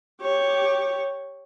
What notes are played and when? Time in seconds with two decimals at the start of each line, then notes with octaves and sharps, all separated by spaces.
0.21 G4 C#5